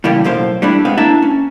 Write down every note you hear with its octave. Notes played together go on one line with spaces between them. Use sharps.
A2 C#3 E3 G3 A#3 G4
B1 F#2 A2 A#3 C5 F5
G3 A3 D4 E4
G#3 B3 C4 F5
A#3 D4 E4 E5 A5 A#5
C#4